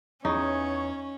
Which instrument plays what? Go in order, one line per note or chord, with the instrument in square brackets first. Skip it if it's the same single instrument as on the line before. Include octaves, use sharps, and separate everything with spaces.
[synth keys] E2 [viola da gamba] C#4 [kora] D#4 [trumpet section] C#5